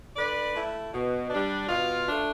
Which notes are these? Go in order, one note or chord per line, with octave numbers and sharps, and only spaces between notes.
D3 B4 D5
A3 E4
B2
G3 D4
B2 F4
A3 D4